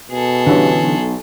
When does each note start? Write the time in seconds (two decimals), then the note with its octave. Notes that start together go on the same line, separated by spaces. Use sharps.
0.11 B2 G#4 A4
0.47 G2 D3 E3 C#4
0.83 B1